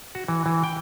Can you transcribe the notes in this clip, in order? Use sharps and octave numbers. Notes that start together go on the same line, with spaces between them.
F#4
E3
E3
G5